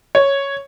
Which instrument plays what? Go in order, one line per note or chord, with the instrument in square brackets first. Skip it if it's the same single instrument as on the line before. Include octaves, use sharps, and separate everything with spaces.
[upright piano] C#5